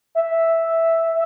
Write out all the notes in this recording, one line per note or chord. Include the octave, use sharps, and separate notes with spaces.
E5